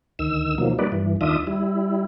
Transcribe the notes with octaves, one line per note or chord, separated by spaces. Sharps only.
D2 D#3 E6
B2 D#3 F3 F#3 A#3
G3 A#3 D#4 B4 D5
G2 E3
D#2 D#3 D4 F4 E5 D#6
G3 E4